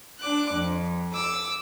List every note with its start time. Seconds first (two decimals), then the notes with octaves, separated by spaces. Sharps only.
0.21 D4 D6 F#6
0.53 F2
1.13 D6 E6